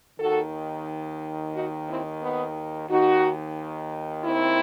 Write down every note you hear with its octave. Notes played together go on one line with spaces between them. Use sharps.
D#2 D#3 F#4 A4
D#4 F#4
C4 E4
B3 D#4
D#2 D#3 D#4 F#4
C4 E4